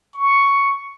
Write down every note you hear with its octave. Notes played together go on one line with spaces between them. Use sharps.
C#6